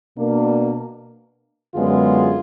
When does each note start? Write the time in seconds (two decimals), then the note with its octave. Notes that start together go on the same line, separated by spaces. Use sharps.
0.17 B2 A#3 D4
1.75 F#2 D3 G#3 B3 F4 G#4